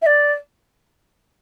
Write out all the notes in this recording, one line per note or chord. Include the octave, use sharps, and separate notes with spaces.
E5
D5